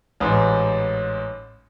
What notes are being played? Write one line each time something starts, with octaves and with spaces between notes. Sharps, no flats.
A1 G#2